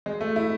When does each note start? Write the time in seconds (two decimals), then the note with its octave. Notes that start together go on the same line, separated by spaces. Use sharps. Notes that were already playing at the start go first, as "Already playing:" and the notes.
0.06 G#3
0.21 A3
0.36 E4